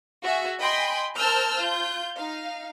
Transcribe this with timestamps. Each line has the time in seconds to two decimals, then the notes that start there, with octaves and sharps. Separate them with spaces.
0.23 F#4 G#4 E5
0.61 D#5 G5 G#5 B5 C6
1.16 A#4 C5 A5 E6 F6 G6
1.56 F4 G6
2.15 D#4 F5